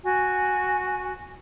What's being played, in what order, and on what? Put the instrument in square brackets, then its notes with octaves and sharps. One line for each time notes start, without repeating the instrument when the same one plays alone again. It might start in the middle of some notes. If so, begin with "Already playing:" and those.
[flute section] F#4 G#5